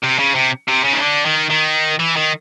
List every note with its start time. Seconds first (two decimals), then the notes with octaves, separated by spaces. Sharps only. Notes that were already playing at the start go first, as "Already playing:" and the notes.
0.03 C3
0.19 C#3
0.35 C3
0.68 C3
0.84 C#3
0.93 D#3
1.02 D3
1.26 D#3
1.51 D#3
1.99 E3
2.16 D#3